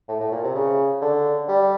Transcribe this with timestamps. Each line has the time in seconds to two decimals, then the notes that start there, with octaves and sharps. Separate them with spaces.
0.09 A2
0.21 A2
0.32 A#2
0.44 C3
0.55 C#3
1.02 D3
1.48 G3